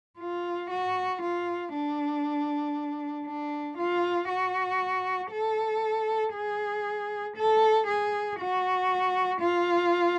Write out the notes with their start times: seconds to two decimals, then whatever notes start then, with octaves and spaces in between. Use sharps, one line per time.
0.19 F4
0.70 F#4
1.22 F4
1.73 D4
3.26 D4
3.78 F4
4.29 F#4
5.31 A4
6.34 G#4
7.36 A4
7.87 G#4
8.39 F#4
9.41 F4